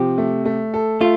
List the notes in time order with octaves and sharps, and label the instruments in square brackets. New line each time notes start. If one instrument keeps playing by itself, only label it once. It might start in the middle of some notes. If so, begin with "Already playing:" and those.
Already playing: [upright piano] C3 F3 [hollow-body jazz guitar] G4
[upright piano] A3
A3
A4
[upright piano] A3 [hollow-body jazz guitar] F4